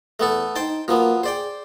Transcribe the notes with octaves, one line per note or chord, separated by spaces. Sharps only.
E2 A3 B3 A4
D#4 C5 G5 A5
F3 F#3 A#3 B3
G#4 C5 D5 G5